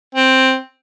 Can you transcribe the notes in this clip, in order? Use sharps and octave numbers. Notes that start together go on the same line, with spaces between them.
C4